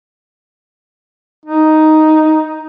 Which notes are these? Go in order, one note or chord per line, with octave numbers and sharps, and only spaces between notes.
D#4